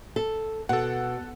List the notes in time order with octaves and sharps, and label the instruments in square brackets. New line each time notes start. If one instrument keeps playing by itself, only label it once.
[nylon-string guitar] A4
[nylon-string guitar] B2 [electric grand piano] A4 F#5